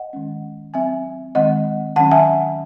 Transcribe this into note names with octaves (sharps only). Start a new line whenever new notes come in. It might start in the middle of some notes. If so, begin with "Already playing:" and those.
Already playing: D#5 F#5
D#3 G#3 C#4
F#3 C4 E5 G#5
D#3 G#3 C4 D#5 F#5
D#3 F#3 C#4 F#5 A5
E5 G#5